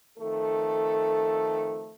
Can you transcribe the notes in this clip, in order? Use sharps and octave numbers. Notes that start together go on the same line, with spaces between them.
F2 D#3 A3 A4